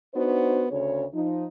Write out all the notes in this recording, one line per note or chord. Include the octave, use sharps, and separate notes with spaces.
B3 D4 D#4 F#4 C5
D2 C#3 C#5
F3 D#4